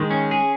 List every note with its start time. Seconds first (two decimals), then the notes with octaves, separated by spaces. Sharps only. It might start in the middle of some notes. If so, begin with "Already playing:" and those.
Already playing: D#3 G#3
0.11 C#4
0.31 G#4